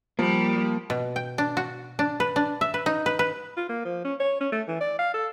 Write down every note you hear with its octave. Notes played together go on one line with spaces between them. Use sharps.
F3 G3 A#3 B5
B2
G5
D4
F#4
D4
B4
D4
E5
B4
D#4
B4
B4
F4
A#3
F3
C#4
C#5
C#4
A3
E3
D5
F5
A4